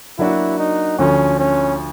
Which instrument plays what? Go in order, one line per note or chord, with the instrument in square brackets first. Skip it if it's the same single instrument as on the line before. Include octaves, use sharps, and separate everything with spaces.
[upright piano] F#3 A#3 D4 F#4 [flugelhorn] E4
[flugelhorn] D#4
[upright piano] D2 D3 F3 [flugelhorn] C#4
[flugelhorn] C#4